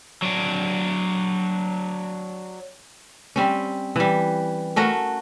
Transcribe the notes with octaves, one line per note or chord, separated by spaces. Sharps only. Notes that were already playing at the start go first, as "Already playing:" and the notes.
F#3 D4
G3 C4 C#4
E3 G3
A3 C#4 F#4 A#4